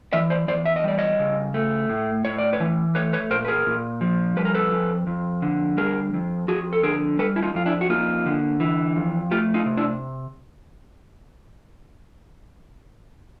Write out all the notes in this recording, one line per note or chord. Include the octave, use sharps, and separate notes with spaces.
E3 D5 E5
C5 D5
E2 C5 D5
E5
D#5
G3 D5
C#5 D#5
C#3
A3
A2
A2 C#5
D5
B4 C#5
E3
A3 B4 C#5
B4 C#5
A#2 A#4 C5
B4
G#4 A#4
A#2
F3
G3 B4
A#4
A4 B4
F2
F2
D3
G3 G#4 A#4
F2
F2 F#4 G#4
A4
D3 G#4 A#4
G3 A4 B4
E4
D#4 F4
F2 F4
D4 E4
F#4
A#3 D#4 F4
D3
E3
F2
A3 F4 G4
D#4 F4
C3
D4 E4